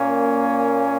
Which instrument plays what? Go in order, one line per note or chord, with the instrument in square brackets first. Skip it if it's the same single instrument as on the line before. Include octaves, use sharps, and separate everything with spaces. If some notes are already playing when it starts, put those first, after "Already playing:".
Already playing: [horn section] A#2 A#3 C#4